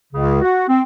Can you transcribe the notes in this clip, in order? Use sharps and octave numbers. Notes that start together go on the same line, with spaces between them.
C#2 C#3
F#4
C4